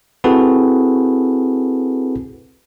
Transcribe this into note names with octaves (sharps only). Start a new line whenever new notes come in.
C4 E4 F#4 G#4 A4 B4